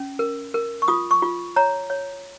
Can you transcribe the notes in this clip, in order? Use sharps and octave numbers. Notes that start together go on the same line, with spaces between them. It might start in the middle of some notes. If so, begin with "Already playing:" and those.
Already playing: C#4
A#4
A#4
C#6
F4 D#6
C#6
F4
C#5 A#5
C#5